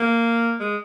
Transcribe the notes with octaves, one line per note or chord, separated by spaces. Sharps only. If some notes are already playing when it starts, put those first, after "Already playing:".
Already playing: A#3
G#3